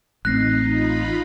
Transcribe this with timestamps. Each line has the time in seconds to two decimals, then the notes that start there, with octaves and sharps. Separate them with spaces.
0.25 A1 A3 C4 D#4 F#6 A#6 C7
0.67 D#4 F4 B5